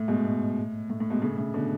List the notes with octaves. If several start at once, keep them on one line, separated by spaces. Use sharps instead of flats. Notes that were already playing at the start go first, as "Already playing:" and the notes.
Already playing: A2
G#2 B2
A2
A2
A2
G#2 B2
A2 C#3
A2 C#3
B2 D3